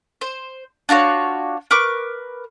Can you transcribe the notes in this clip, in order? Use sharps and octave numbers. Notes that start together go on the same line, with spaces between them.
C5
D4 F4 F#4 C#5
A#4 B4 C#6 D6